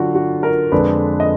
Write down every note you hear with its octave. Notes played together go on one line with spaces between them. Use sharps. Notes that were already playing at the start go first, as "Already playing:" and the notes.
Already playing: D3 F#3 D4 F4 F#4
F#4
A#4
F2 D3 G#3 D4 B4
D#5